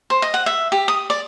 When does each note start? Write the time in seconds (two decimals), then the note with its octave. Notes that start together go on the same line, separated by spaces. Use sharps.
0.10 C5
0.22 D#5
0.34 F#5
0.46 E5
0.72 G4
0.88 D#6
1.10 D5